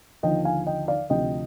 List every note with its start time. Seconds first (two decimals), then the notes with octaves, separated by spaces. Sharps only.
0.23 D#2 D3 F3 D#5 G5
0.45 F5 G#5
0.67 D#5 G5
0.88 D5 F5
1.10 D2 C3 F3 D#5 G5